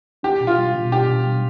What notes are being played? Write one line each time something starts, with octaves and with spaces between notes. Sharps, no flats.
D4 G4
B2
F4
G3
B2
D4 G4
B2
G3